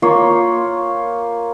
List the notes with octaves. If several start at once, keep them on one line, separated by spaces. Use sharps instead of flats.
A#3 F4 C5 C#5